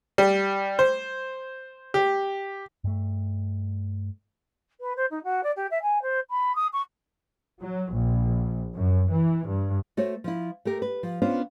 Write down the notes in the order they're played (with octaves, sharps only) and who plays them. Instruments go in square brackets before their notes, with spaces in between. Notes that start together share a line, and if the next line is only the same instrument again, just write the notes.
[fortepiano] G3
C5
G4
[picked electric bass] G2 A3
[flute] B4
C5
D#4
F#4
D5
G4
E5
G#5
C5
B5
D#6
C#6
[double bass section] F#3
A#1
F#2
E3
G2
[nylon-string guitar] A3 F#4 C5 C#5
F3 E4
A3 G4 A#4
B4
F3
B3 C#4 D4 F4 C5